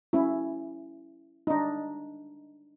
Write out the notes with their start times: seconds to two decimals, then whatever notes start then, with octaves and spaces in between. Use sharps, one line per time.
0.13 C#4 E4
1.47 D4 D#4